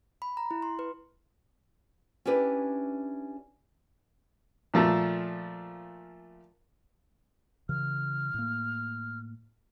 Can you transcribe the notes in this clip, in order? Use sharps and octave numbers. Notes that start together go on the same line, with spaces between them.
B5
A#5
E4
C6
B4
C#4 D4 E4 G4 B4
A#2 F3 A3
C#3 E3 F6
A2 A#3